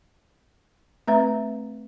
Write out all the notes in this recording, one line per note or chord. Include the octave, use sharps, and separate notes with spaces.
A3 C4 B4 E5 A#5